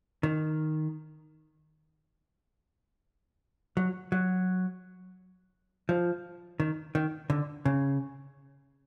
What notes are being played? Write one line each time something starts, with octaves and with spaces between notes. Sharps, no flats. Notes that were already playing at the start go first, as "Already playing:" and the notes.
D#3
F#3
F#3
F3
D#3
D#3
D3
C#3